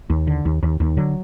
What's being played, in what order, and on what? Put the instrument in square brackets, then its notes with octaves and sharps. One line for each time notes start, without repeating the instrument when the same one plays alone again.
[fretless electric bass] D#2
D3
D#2
D#2
D#2
D3 F#3